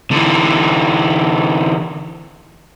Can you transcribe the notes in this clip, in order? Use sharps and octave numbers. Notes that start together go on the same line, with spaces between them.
D3 E3